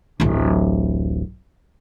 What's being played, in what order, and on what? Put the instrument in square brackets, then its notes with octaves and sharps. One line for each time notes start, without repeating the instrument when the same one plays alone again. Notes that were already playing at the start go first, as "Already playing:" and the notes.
[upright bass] D1 A1